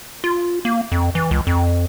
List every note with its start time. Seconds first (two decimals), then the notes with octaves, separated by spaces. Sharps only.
0.24 F4
0.65 A#3
0.92 F2
1.15 E3
1.31 C#2
1.47 F2